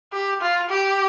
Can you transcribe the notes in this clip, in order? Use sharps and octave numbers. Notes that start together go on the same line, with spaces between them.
G4
F4
G4